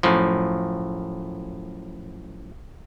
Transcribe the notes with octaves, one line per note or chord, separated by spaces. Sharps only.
F#2 A2 F3